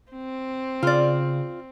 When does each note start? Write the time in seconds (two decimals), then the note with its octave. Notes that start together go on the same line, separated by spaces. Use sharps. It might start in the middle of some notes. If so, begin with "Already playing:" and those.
0.12 C4
0.83 C#3 F4 D5